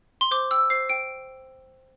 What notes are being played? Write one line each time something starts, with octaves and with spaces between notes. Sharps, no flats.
C6
C5 D6
G5 E6
C5 C7
G5 D7